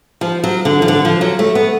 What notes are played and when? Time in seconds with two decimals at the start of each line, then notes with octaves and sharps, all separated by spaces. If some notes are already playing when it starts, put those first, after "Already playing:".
0.21 F3
0.44 F#3
0.65 D3
0.82 F3
0.88 D3
1.05 F3
1.21 F#3
1.39 A3
1.55 B3